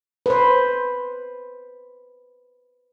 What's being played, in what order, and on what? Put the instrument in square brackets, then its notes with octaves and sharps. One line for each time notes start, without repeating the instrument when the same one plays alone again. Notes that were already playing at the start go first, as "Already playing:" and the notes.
[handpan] B4 C5